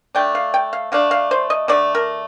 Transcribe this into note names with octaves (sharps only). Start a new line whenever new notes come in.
D3 A3 D4 G5
F5
G5
F5
D3 A3 D4 F5
F5
C5
D#5
D3 A3 D4 D5
A#4